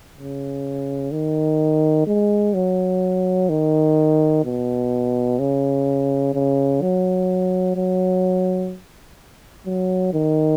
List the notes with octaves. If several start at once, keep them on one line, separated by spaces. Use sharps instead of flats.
C#3
D#3
G#3
F#3
D#3
B2
C#3
C#3
F#3
F#3
F#3
D#3